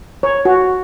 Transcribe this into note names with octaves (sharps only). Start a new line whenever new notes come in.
C#5
F#4